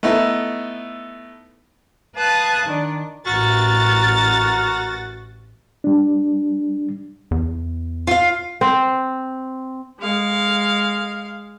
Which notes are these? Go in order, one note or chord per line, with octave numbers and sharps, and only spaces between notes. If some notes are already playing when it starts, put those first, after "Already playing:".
A3 B3 D#4 E4 A4
B4 F5 A5 D#6 F#6 G#6
D#3 D4
A1 F#4 A#4 A6
G3 D4
E2
F4 F5
C4
G#3 F5